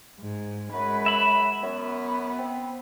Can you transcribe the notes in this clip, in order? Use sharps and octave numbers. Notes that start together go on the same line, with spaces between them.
G#2
F#2 G#3 B4
E5 B5
F#2 B3
C4